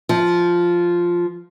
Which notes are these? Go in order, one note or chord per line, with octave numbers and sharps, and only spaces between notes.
F3